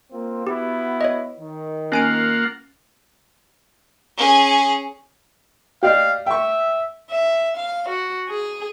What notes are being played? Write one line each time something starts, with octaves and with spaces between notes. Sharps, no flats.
A#3 C4 F4
B3 E4 F#4 G4
C#5 D#5
D#3
A#3 C#4 F4 F#5 G#5 D7
C#4 G#4
G4 D5 D#5 F5
E5 G5 C#6
E5
F5
F#4
G#4